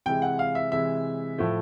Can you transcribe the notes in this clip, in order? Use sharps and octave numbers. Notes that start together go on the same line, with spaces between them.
C3 E3 G#3 G5
F#5
F5
E5
C3 E3 G#3 E5
A2 F3 A3